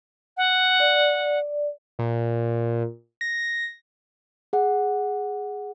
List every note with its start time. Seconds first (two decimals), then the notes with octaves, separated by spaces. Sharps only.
0.37 F#5
0.80 D5
1.99 A#2
3.21 A#6
4.53 G#4 F#5